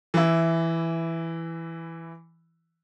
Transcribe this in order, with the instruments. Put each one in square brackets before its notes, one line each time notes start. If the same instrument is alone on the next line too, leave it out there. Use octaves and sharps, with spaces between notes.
[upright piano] E3 E4